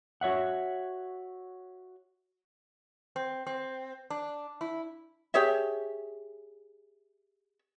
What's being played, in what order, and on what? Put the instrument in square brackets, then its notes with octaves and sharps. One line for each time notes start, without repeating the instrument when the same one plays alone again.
[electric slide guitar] F#4 C#5 E5 F#5
[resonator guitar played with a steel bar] C4
C4
D4
E4
[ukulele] G4 G#4 C#5 E5